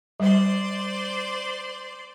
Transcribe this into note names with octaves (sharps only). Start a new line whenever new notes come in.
G3 C5 D5 C6